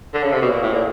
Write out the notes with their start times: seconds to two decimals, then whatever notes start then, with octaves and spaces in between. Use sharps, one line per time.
0.14 D3
0.23 C#3
0.32 C3
0.41 B2
0.50 A#2
0.62 A2
0.73 A#2